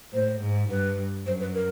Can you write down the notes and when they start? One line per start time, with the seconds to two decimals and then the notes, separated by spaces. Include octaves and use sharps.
0.13 A2 C5
0.42 G#2
0.70 G2 B4
1.26 F#2 C5
1.41 B4
1.55 A#4